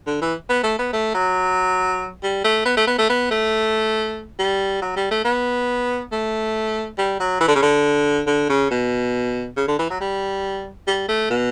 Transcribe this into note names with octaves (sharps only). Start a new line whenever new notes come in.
D3
E3
B3
A3
B3
A3
F#3
G3
A3
B3
A3
B3
A3
B3
A3
G3
F#3
G3
A3
B3
A3
G3
F#3
E3
D3
C#3
D3
D3
C#3
B2
C#3
D3
E3
F#3
G3
G3
A3
B2